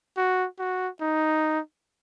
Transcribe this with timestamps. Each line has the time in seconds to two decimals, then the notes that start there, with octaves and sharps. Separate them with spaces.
0.17 F#4
0.59 F#4
1.01 D#4